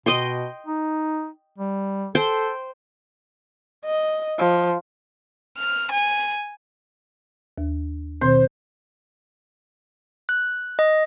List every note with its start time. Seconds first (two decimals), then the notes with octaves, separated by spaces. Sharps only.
0.06 B2 D#5 G5 C6
0.67 D#4
1.58 G3
2.15 A4 C5 G5
3.85 D#5
4.38 F3
5.58 F6
5.92 G#5
7.58 D#2
8.21 B2 D#3 C4 C5
10.29 F#6
10.79 D#5